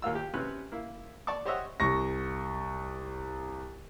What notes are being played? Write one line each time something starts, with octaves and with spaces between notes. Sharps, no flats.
D#2 A#3 F4 E6
G4
C3 C#4 B4 F#6
A#3 E4
D5 A5 C#6 D6
G4 C5 C#5 D#5 E5 F#5
C2 C#6 A#6